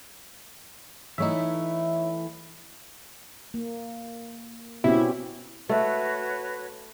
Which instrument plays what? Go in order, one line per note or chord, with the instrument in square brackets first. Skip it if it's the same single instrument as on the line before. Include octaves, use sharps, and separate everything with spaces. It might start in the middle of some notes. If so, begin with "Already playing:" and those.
[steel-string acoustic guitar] E3 A3 E4 [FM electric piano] D#4 C#5 E5
[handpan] A#3
[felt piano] B2 [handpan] C4 C#4 G4 [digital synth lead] E4
[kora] A3 [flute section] F#4 B4 C#5